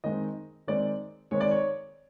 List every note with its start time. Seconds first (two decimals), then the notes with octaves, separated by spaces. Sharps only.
0.04 D#3 G#3 C4 D#5
0.67 D#3 G#3 C4 D5
1.31 D#3 G#3 C4 C#5
1.41 D5
1.51 C#5